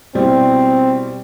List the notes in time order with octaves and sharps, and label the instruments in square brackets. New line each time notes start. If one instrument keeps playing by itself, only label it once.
[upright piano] B2 G3 E4 [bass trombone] C4